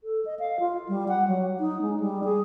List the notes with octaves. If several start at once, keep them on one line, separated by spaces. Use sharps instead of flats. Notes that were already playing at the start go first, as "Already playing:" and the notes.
A4
D#5
F5
F4
G3
F#5
F#3
D#4
G#3
G3
G#4